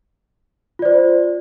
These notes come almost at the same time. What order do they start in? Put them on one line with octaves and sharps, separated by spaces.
F4 D5 C5